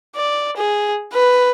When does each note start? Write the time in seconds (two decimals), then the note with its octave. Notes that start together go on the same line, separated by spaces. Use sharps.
0.15 D5
0.57 G#4
1.13 B4